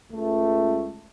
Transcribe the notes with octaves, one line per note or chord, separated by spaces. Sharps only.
C#2 A3